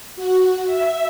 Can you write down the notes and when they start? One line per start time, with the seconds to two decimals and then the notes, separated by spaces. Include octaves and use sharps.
0.16 F#4
0.66 E5